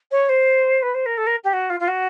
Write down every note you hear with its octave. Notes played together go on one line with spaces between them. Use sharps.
C#5
C5
B4
C5
A#4
A4
A#4
G4
F#4
F4
F4
F#4